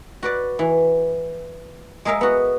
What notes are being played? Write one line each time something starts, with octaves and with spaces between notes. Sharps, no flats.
F#4 B4 D5
E3
G#3 G#4 A#4 E5 F5
B3 F#4